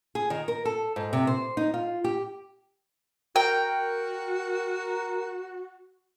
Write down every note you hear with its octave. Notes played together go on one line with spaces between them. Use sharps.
G#4
D#3
A#4
A4
G#2
C3
C5
D#4
F4
G4
F#4 A#4 G5